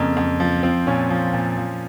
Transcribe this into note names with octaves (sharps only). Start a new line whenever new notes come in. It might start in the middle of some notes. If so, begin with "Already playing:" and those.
Already playing: F2 C#3 A#3
F2
F3
F3 C4
A#2 C#4
F3
A#2
F3